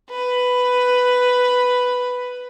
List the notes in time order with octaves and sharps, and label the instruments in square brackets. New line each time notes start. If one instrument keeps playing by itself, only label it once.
[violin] B4